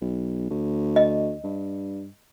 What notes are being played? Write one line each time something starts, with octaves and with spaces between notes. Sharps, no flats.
B1
D2
D#5
G2